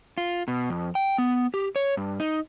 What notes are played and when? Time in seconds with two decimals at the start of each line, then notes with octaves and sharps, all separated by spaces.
0.18 F4
0.48 B2
0.70 F2
0.95 G5
1.18 B3
1.54 G4
1.76 C#5
1.97 G2
2.20 D#4